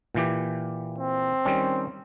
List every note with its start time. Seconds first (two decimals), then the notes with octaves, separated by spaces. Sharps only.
0.15 A#2 E3 G4
0.98 C4
1.45 D#3 G3 C#4